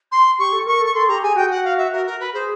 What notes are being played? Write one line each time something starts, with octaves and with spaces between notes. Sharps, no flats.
C6
G4 C#6
A4
A#4 C#6
A4
C#6
A4 C6
G4 A#5
G#4 G#5
F#4 G5
F#5
F5
E5
A#4
A#4
B4
G#4 C5